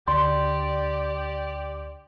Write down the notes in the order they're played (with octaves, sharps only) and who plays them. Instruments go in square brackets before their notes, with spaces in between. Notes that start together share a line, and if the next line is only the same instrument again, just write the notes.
[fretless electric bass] D2 [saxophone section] G4 D5 [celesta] C6